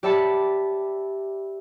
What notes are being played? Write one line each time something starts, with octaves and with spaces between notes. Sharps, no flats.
G4 D5 E5 A5 B5 C#7